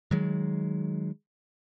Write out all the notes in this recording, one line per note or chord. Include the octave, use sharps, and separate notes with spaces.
D#3 F#3 G#3